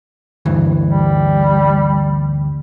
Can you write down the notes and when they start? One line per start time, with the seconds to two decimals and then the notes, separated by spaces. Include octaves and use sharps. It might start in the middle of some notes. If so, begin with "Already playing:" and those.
0.46 D2 G2 E3
0.82 G3